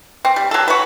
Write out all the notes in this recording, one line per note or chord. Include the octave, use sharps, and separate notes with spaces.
C4
G3
F#3 A4
F#4 B4